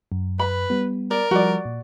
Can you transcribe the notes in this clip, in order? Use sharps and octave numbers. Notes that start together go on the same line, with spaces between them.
F#2
B4 B5
G3 B3
A#4 D5
F3 G3 F#4 D5
A#2